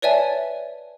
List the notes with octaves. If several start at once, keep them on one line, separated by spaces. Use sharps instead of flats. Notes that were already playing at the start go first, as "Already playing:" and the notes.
B4 C#5 D5 E5 G#5 A5